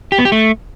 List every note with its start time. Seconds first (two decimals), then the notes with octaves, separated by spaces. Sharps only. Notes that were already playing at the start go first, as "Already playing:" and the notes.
0.12 G4
0.19 B3
0.25 G4
0.32 A3